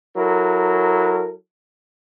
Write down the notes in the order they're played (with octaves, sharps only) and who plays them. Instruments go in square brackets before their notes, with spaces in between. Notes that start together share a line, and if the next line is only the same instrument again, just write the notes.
[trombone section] F#3 E4 A4 A#4